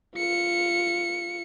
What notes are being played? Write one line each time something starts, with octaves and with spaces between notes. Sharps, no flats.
F4 C#7